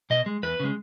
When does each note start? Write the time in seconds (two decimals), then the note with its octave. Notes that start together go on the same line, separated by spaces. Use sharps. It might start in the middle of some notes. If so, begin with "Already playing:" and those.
0.10 B2 D#5
0.26 G#3
0.43 E2 B4
0.60 C#3 G#3